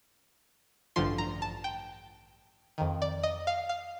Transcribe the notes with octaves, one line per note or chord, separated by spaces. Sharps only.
A1 G2 D3 F3 C6
A#5
A5
G5
F2 D#3
D5
D#5
F5
F5